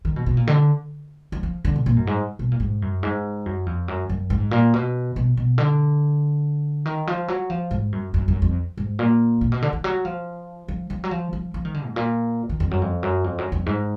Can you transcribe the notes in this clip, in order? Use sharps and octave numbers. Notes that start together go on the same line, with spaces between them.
D#3
B2
B2
A#2
D3
F3
F3
D3
B2
A#2
F#2
G#2
B2
A#2
G#2
F#2
G#2
F#2
F2
F#2
F#2
G#2
A#2
B2
B2
B2
D3
D#3
F3
F#3
F3
G#2
F#2
F#2
F#2
F2
G#2
A#2
A#2
B2
D3
D#3
F#3
F3
F3
F3
F#3
F3
F3
F3
D#3
D3
G#2
A#2
D#3
F2
F#2
F2
F#2
F2
F#2
F2
G#2